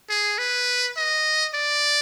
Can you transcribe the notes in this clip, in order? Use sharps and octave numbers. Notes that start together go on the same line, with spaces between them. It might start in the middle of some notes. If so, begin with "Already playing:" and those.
G#4
B4
D#5
D5